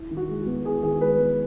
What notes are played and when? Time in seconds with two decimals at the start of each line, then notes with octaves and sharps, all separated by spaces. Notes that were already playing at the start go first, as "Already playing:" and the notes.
Already playing: E4
0.10 D#3
0.17 F#4
0.29 G#3
0.41 F#4
0.46 B3
0.65 E4 G#4
0.83 D#3 G#4
1.00 G#3 B4
1.19 B3